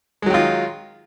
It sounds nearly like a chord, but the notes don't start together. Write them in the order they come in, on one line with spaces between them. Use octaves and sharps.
G#3 F#3 D#3 F4